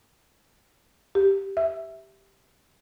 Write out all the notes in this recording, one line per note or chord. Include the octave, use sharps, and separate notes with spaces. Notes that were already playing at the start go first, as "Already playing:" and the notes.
G4
E5